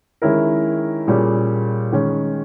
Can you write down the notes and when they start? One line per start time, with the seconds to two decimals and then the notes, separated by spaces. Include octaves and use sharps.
0.22 D#3 G#3 C#4 E4 A#4
1.08 A#2 G3 C#4 G#4
1.92 D#3 G#3 C#4